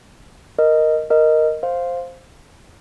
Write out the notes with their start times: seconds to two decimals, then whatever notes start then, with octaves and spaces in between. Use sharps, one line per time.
0.59 A#4 D#5
1.10 A#4 D#5
1.63 C5 F5